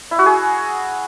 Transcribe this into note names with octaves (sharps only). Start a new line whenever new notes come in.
E4
F#4
G#4